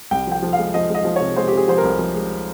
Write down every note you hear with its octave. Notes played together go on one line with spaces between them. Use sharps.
C2 G5
F3 G5
F3
F5
G#3
F3 D#5
G#3 D#5
F3
C3 C#5
G#3 C5
C3 G4
G#4
F3 C5
A#4
C2
F3
G#3